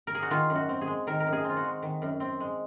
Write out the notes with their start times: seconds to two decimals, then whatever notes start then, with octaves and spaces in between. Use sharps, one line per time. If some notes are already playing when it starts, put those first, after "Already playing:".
0.07 A#4
0.15 G#4
0.23 F#4
0.30 D#3 F4
0.50 F#2
0.55 F#4
0.69 C4
0.81 G#4
0.87 G#3
1.07 D#3 A#4
1.20 A#4
1.26 F#2
1.33 G#4
1.44 C4
1.50 F4
1.57 F#4
1.64 G#3
1.82 D#3
2.02 F#2
2.20 C4
2.40 G#3